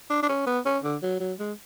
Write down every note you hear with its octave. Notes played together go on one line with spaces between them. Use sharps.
D4
D4
C#4
B3
C#4
D3
F#3
F#3
G#3